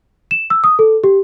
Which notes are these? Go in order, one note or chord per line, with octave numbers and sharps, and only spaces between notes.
E7
E6
D#6
A4
G4